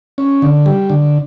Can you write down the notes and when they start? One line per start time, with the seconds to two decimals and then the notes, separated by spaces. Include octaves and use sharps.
0.18 C#4
0.42 D3
0.66 G3
0.90 D3